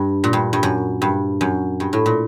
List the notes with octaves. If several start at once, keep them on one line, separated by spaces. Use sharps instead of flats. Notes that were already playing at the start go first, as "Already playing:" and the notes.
Already playing: G2
A#2
G2
G2
F#2
G2
F#2
G2
A2
A#2